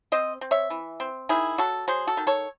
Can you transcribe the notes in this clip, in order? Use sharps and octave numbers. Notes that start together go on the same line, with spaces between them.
C4 C5 D#5
C4
C#5 E5
E3
C4
D#3 E4 G#4
F#3 F#4 A4
F#3 G#4 C5
F#4 A4
D#3
A4 C#5